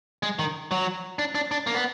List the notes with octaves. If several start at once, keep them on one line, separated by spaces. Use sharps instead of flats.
G#3
D#3
F#3
D4
D4
D4
A#3
B3